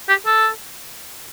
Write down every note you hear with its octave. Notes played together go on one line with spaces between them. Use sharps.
G4
A4